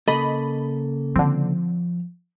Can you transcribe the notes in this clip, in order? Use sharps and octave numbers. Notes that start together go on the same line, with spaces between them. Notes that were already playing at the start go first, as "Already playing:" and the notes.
C#3 A#3 A4 D#5 B5
D3 F3 C4